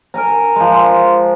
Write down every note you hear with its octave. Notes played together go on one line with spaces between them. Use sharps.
A#4 G#5 A#5
F3 G#3